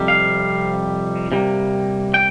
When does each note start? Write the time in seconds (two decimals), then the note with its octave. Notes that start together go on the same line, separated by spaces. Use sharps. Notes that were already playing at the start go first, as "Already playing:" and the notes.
Already playing: F2 C3 G3
0.08 F5
1.32 C3 G3 A#3
2.14 G5